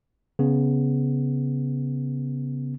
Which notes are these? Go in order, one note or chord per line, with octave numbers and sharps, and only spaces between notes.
C#3 B3